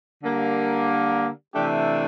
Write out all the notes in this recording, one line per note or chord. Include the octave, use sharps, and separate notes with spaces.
D3 G3 A#3
C3 E3 A3 D4 G4